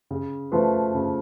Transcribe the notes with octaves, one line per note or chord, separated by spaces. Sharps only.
C#3
F3 A3 F4 B4
C#3